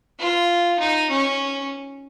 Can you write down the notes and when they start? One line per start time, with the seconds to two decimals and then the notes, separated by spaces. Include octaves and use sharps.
0.19 F4
0.79 D#4
1.10 C#4